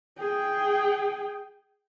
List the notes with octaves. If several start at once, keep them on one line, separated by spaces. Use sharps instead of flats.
G#4 G5